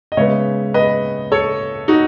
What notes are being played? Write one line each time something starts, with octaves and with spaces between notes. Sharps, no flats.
D#5
C#3 G#3 B3 C#5 E5
B4 D#5
A4 C#5
D#4 F#4